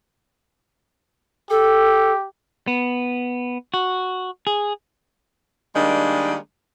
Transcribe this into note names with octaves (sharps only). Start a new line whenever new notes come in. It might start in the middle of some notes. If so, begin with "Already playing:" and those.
G4 A4
B3
F#4
G#4
D#3 G3 G#3 A#3 D4